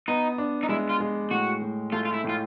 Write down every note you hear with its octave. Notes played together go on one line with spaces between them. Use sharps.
B3 D#4
D4
D#4
G#3 E4
F4
G#3
A2 F#4
A2
A3 F4
F4
E4
A2 F4